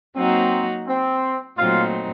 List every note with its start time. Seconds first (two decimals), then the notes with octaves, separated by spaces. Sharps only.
0.16 F#3 A#3 C4 D#4 F#4
0.87 C4
1.58 A#2 F#3 A3 C4 D#4 F4